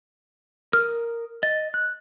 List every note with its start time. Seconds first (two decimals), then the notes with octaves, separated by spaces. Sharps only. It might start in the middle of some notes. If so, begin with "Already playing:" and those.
0.73 A#4 D#6 F6
1.43 D#5 A6
1.74 F#6